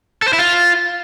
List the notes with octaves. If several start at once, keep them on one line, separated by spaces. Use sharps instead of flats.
A4
C5
E4
F4